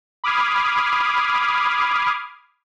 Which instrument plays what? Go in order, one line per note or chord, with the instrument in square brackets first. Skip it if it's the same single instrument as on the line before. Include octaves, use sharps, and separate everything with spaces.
[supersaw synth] B5 D6 D#6 F6 G#6 C7